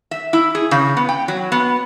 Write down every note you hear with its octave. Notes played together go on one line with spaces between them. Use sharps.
E5
E4
G#4
C#3
B3
G5
F#3
B3